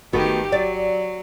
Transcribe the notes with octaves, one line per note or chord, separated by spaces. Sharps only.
G1 D#3 A3 B3 F#4 G4
F#3 D5